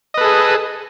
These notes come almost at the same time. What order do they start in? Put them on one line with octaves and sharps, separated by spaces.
D#5 B4 A4 G#4